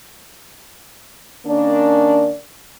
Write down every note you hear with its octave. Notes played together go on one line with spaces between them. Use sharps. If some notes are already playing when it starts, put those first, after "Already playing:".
D#3 A#3 C#4 D4